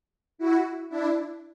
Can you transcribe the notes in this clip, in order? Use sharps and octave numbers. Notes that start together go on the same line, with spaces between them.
E4 F#4
D4 E4